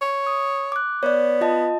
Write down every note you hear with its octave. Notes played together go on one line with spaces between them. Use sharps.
C#5
D#6
D6 F#6
B3 C#5 D5
F4 D#5 A5